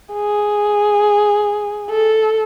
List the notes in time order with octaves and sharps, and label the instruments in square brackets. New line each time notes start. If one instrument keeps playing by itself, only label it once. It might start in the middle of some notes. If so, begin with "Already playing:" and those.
[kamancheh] G#4
A4